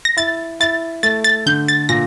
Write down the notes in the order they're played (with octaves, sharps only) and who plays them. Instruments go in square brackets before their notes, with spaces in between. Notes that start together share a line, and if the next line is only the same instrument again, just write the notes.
[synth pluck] A#6
[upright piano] E4 [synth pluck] A6
[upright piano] E4 [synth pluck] A6
[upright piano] A3 [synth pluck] A6
[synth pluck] A6
[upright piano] D3 [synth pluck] G6
[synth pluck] A6
[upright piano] A#2 [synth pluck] A#6